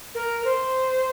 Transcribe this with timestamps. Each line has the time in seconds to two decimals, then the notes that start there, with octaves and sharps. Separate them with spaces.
0.14 A#4
0.45 C5